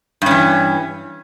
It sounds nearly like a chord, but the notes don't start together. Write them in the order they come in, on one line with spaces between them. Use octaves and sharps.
G2 C#4 E3